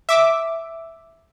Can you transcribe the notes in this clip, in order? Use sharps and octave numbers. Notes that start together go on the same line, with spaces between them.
E5 D6